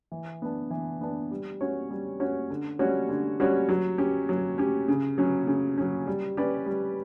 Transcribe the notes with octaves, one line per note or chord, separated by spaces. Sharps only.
E3
B3 D4
E3
B3 D4
G3
C#4 F#4 C#5
G3
C#4 F#4 C#5
D3
G3 C#4 F#4 C#5
D3
G3 C#4 F#4 C#5
F#3
C#4 G4
F#3
C#4 G4
C#3
F#3 C#4
C#3
F#3 C#4
G3
C#4 G4 B4 D5
G3